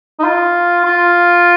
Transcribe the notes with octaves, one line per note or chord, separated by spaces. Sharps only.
D#4
F4
F4